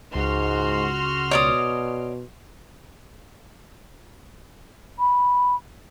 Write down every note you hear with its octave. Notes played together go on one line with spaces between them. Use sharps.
C#2 G#2 F#4 C6 F6
B2 C#5 D5 D#6
B5